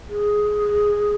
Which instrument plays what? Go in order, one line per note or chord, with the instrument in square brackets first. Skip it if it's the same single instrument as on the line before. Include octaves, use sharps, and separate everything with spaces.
[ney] G#4